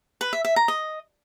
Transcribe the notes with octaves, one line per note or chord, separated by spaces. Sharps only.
B4
E5
E5
A#5
D#5